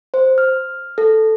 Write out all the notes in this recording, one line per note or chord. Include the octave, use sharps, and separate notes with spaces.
C5
F6
A4